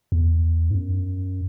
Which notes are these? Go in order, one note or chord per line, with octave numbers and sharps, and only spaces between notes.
E2
G#2
F#2